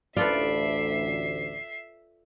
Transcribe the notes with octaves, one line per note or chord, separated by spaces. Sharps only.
A1 D2 F4 A4 B4 D5 E5 C7